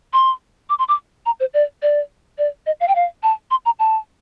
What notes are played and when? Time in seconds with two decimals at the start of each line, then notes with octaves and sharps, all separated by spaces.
0.13 C6
0.69 D6
0.79 C6
0.88 D6
1.26 A#5
1.40 C5
1.54 D5
1.82 D5
2.38 D5
2.66 D#5
2.80 F5
2.88 G5
2.95 F5
3.23 A5
3.51 C6
3.65 A#5
3.79 A5